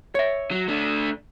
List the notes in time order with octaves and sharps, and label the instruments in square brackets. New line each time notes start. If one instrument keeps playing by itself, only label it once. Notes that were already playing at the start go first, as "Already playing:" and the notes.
[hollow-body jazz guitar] C#5 E5
[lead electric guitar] F#3
A3 D4